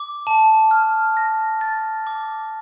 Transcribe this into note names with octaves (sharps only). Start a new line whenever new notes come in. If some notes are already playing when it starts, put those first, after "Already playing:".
Already playing: D6
A5
F6
A#6
A6
D6